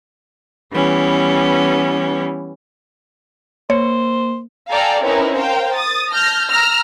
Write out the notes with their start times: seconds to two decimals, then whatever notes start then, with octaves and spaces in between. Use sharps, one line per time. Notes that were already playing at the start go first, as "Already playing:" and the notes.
0.73 E3 G3 B3 C#4
3.70 A#3 C5 C#5
4.70 A4 D5 F5 G5 G#5 A#5
5.04 C4 C#4 D#4 E4 A#4 B4
5.36 A#4 C5 F5 G5
5.75 D#6 A6
6.10 A5 F6 G6 A#6
6.49 A#5 E6 F6 A#6